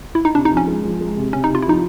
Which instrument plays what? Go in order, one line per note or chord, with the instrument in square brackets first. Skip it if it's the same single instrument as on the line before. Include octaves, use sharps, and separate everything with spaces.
[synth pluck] E4
D#4
[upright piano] C3 [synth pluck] D4
[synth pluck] D#4
[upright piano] F3
[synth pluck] C#4
[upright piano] G#3
F3
G#3
C3
[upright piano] C3 [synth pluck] C#4
[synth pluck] D#4
[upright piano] C3
[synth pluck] F4
E4
[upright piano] F3 [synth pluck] D#4